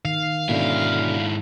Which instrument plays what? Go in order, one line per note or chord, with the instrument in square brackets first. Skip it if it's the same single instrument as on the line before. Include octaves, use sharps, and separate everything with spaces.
[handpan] D#3 [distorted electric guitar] F5
[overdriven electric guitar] G#2 E4 [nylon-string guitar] B2 D3 C#4